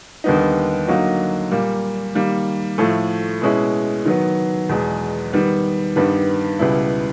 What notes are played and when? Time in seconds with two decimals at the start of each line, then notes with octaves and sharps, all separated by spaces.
0.24 D#2 D3 G3 B3 D#4
0.87 D3 F#3 A#3 D#4 F#4
1.51 A#2 G3 A#3
2.15 D#3 G3 A#3
2.78 A2 F3 A3
3.42 B2 G#3 C#4 E4
4.06 D#3 F#3 B3
4.69 E2 B2 G#3
5.33 D#3 G3 B3
5.96 G2 D#3 G3 B3
6.59 C#2 B2 G3 B3 E4